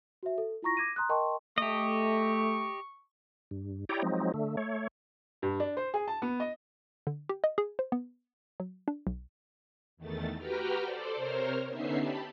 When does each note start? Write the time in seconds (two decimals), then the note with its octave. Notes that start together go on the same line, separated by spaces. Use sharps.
0.23 F#4 C5 E5
0.38 A4
0.62 E4 F4 A#5 C#6 A#6
0.77 D6 G#6 A#6 D#7
0.96 A#5 C6 D#6 F#6
1.09 A#4 D#5 G5 A5 C6 C#6
1.58 A3 G4 D#5 C#6
3.51 G2
3.89 E4 G4 C#5 D5 G5 A#5
4.02 F3 F#3 G#3 C4 D#4
4.34 D3 A3
4.57 A3 C#5
5.42 G2
5.60 D4
5.77 C5
5.94 G#4
6.08 A5
6.22 B3
6.40 D#5
7.07 D3
7.29 G4
7.44 D#5
7.58 G#4
7.79 C5
7.92 B3
8.60 F#3
8.88 D4
9.07 B1
9.97 E2 D#3 A3 A6
10.37 F#4 G4 B4 G5 A#5 F6
10.79 A4 C5 D5
11.16 C3 A#4 C5 C#5 F6
11.67 D3 B3 C#4 D#4 E5 C7
11.97 G4 A5 B5